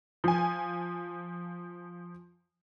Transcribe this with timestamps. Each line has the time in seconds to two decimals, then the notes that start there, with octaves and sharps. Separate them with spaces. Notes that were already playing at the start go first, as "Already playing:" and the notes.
0.24 F3 G#5